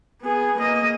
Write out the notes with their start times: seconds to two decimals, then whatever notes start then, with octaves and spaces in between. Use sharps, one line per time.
0.22 B3 G#4
0.57 A#3 D#5